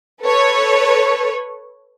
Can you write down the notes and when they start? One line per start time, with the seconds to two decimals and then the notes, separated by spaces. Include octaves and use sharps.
0.24 A4 B4 C#5